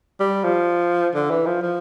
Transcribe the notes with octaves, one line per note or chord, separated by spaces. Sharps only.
G3
F3
D3
E3
F3
F3